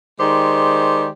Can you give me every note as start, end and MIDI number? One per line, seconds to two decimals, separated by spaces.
0.20 1.07 51
0.20 1.07 56
0.20 1.07 67
0.20 1.07 72
0.20 1.07 74